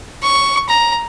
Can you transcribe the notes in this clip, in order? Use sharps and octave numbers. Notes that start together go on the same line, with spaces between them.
C#6
A#5